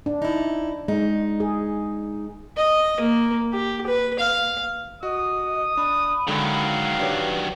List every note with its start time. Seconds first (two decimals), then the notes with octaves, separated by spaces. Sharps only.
0.06 D4
0.22 D#4 E4
0.88 G#3 D#4
1.40 G#4
2.57 D#5
3.00 A#3
3.52 G4
3.86 B4
4.19 F5
5.03 F#4 D#5 D#6
5.77 D4 B5
6.28 D3 D#3 F#3 G#3 G#4 F5
7.00 D4 G4 B4 C#5